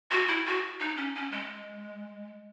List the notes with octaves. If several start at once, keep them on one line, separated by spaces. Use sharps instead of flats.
F#4
E4
F#4
D#4
C#4
C#4
G#3